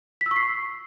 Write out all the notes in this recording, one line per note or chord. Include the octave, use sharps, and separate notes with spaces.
B6
E6
C#6
C7